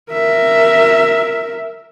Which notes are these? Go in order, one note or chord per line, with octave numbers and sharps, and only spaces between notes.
A#4 E5